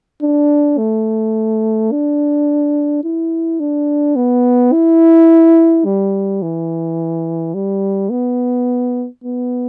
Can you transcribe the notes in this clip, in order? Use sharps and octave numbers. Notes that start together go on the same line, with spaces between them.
D4
A3
D4
E4
D4
B3
E4
G3
E3
G3
B3
B3